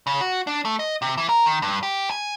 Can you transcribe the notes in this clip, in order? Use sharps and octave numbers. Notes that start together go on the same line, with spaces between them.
C#3
F#4
D4
A3
D#5
C3
E3
A#4
D#3
G2
G4
G#5